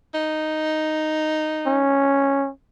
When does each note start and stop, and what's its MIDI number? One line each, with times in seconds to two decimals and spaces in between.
0.15 1.89 63
1.66 2.50 61